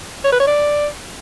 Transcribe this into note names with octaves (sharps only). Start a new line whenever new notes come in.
C#5
B4
C#5
D5